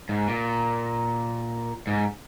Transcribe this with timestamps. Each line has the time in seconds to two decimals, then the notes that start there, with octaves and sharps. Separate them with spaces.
0.09 G#2
0.28 A#2
1.87 G#2